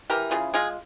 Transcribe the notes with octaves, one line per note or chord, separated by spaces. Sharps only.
E3 G4 A#4
C#3 F4 G#4
G#3 F4 G#4